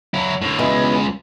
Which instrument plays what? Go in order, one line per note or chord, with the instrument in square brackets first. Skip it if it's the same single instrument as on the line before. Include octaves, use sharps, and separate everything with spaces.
[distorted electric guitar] F#3 E4
A2 D3
[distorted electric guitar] C#2 G#3 [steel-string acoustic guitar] B2 E3